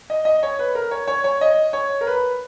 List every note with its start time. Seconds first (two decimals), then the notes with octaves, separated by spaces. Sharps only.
0.10 D#5
0.25 D#5
0.43 C#5
0.59 B4
0.75 A#4
0.91 C#5
1.08 C#5
1.24 C#5
1.41 D#5
1.73 C#5
2.01 A#4
2.07 B4